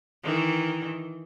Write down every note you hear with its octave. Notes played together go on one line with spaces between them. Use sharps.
D#3 E3